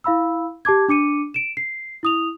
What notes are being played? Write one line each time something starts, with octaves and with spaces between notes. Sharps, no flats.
E4 F5 B5 E6
G4 A5 D6 G#6
D4 D6 C#7 D#7
D7 E7
C7
E4 D#6 F7